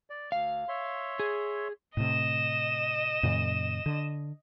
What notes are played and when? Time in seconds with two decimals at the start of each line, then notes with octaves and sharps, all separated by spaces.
0.10 D5
0.32 D2 F5
0.68 C#5 E5 C6
1.20 G#4
1.97 A2 C3 D#5 E7
3.23 F#2 A#2 C#3
3.86 D3